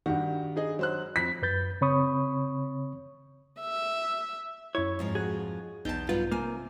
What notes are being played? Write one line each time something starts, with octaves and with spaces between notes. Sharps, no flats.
G2 D#3 F#4 G4
D#4 G#4 D#5
F#3 C5 F#6
F2 B6
F#2 B4 G6 A6
C#3 C4 C#5 B5 C#6 D#6
E5
F#2 E4 C#5
F2 G#2 F3
F#4 G#4
B1 E2 D#4 A5 G6
G2 F#3 F4 B4
C3 A#3 G#5